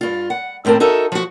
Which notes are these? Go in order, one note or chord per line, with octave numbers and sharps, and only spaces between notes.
G2 F4
F#5
D#2 A2 C4 A#4 A5
D#4 F#4 A4 A#4 E5
F3 F#4